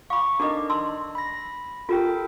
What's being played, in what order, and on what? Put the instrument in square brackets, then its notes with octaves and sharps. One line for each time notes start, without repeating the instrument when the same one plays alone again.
[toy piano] F5 B5 [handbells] C#6 D6
[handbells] D4 D#4 D#5 [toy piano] A4 A#4 D6
[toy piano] A5 C6 E6
[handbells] B5 A#6
[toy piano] F4 G4 [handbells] A4 A#4 G5